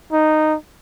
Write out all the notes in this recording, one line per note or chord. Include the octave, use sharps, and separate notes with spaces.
D#4